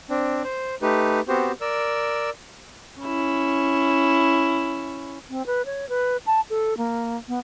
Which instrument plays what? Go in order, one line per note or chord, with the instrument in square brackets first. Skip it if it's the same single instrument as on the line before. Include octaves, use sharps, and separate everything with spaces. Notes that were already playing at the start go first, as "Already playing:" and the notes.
[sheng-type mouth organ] C4 D4
C5
A3 D#4 G4 B4
B3 C4 F#4 G4 C5
A#4 D5 E6
[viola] C#4 E4
[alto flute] C4
B4
C#5
B4
A5
A4
A#3
B3